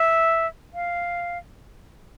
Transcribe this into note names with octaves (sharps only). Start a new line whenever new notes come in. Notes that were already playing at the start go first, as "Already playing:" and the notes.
Already playing: E5
F5